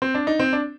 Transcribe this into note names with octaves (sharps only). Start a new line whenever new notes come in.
C4
D4
D#4
C4
D4